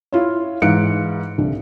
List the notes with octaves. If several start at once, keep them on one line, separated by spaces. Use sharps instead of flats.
E4 F4 C#5
G#2 E3 F5 F#6 C#7 D7
C2 D3